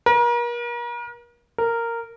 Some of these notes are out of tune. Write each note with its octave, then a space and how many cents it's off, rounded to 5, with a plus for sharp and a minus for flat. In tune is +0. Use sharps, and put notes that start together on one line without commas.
A#4 +40
A#4 -10